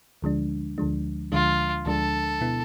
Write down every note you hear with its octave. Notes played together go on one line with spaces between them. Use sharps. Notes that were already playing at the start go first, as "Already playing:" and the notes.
D2 D3 F3 G#3 D4
D2 D3 F3 G#3 D4
D2 D3 F3 G#3 D4 F4
D2 D3 F3 G#3 D4 A4
B2 B3 E4